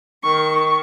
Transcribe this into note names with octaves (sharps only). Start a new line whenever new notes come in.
D#3 C#6